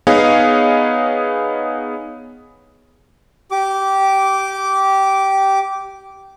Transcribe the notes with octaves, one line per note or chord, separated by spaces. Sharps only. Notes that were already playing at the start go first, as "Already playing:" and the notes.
B3 D#4 G#4 C#5 D#5 F5
G4 D6